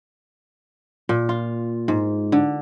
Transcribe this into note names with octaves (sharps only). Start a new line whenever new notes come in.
A#2
F4
G#2
D3